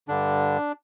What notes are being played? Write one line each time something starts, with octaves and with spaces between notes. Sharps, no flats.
G2 D3 D4